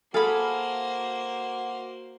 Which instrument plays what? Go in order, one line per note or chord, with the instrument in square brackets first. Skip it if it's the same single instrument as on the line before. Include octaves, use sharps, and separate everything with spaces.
[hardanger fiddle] A#3 C5 [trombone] F#4 [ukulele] G#4 A4 [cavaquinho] F5 B5